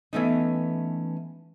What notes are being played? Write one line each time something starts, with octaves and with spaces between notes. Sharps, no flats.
E3 F3 A3 B3 C#4 D#4